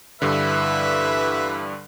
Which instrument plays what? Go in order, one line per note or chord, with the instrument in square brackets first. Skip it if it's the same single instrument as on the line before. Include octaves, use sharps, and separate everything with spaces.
[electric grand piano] G2 D3 [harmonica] E3 B4 E5